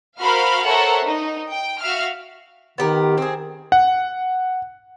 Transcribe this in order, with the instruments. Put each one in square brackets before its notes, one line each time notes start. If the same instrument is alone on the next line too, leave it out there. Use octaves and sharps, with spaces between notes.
[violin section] F#4 A#4 C5 F5 B5 F6
A4 A#4 C5 C#5 E5 F#5
D#4
G5
F#4 E5 F5 F6
[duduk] D#3 [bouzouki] B3 G4 A#4
[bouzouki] C4 G#4
[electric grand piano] F#5